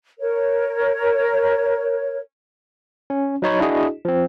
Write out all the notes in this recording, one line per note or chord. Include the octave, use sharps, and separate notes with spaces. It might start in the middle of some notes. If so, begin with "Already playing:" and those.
A#4 C#5
C#4
F#3 D#4 C#5 B5
D4 E4 F#4 G#4 D#5
F3 C4